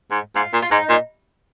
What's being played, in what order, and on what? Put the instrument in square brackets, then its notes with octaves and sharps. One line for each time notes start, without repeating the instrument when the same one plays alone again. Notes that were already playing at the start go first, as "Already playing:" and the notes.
[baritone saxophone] G#2
[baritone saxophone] G#2 [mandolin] F4
[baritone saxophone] A#2
[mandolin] F4
[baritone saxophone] G#2 [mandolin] D#4
[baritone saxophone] A#2